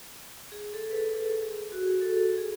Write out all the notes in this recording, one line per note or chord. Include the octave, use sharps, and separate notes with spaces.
G#4
A4
G#4
B4
A4
B4
A4
G#4
F#4
G#4
A4
A4
G#4